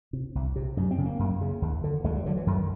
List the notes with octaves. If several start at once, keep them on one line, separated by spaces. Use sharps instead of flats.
C3
C2
C3
F#2
C4
C#3
A#3
F#2
C#3
D#2
D3
D#2 G#3
G3
D3 F#3
E3
F#2 D#3